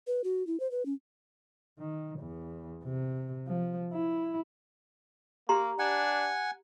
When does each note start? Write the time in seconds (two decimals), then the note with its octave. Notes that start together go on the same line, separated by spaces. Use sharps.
0.07 B4
0.24 F#4
0.47 E4
0.60 C5
0.71 B4
0.86 C#4
1.79 D#3
2.19 E2
2.84 C3
3.47 F3
3.93 E4
5.49 A#3 G4 A#5 C6
5.79 D4 F#5 G#5